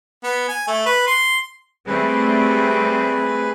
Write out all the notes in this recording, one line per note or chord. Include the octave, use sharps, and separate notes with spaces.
B3
G#5
A3
B4
C6
G3 A3 C4 G#4 B4